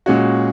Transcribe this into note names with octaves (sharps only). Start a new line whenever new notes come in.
A#2 G#3 C#4 F#4